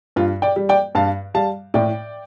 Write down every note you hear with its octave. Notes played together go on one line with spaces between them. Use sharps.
G2 F4
D5 G5
G3
D5 G5
G2 F5 A5
G3 F5 A5
A2 D5 G5